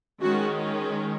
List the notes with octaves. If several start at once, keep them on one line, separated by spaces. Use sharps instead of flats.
D#3 G#3 C#4 F#4